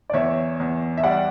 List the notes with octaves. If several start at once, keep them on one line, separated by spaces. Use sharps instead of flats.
D5
E2 C#5 E5
E2
E5
G3 D5 F#5